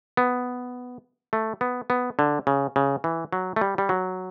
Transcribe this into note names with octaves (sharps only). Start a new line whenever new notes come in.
B3
A3
B3
B3
D3
C#3
C#3
E3
F#3
A3
G3
G3
F#3